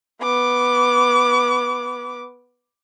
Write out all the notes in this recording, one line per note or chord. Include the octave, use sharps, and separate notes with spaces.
B3 D6